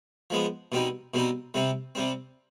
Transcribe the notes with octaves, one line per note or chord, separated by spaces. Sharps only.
F3 G#3 B3
B2 G3 C4 D#4
B2 G3 C4 D#4
C3 G3 C4
C3 G3 C4